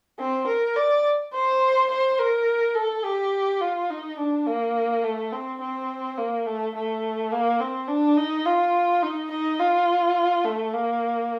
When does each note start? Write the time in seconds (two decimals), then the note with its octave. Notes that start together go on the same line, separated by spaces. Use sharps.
0.19 C4
0.47 A#4
0.76 D5
1.34 C5
1.90 C5
2.19 A#4
2.75 A4
3.04 G4
3.61 F4
3.90 D#4
4.18 D4
4.47 A#3
5.04 A3
5.33 C4
5.61 C4
6.18 A#3
6.46 A3
6.75 A3
7.32 A#3
7.60 C4
7.88 D4
8.18 D#4
8.46 F4
9.03 D#4
9.31 D#4
9.59 F4
10.45 A3
10.73 A#3